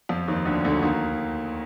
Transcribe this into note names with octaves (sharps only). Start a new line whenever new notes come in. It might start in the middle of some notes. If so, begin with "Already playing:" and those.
F2 F3
D#2 D#3
D2 D3
D2 D3
D#2 D#3